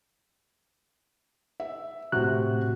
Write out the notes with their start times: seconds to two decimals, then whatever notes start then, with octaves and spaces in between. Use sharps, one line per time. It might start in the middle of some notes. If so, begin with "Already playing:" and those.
1.60 E5
2.12 A2 C3 F#4 F#6